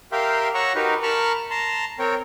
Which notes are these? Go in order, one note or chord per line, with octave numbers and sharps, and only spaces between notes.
G4 A#4 E5 F5 G5 C6
C#5 F#5 A#5 C#6 E6
D#4 F#4 G4 A#4 B4
A#4 A5 B5 C#6 F6
A5 A#5 C6
C4 A#4 C#5 G5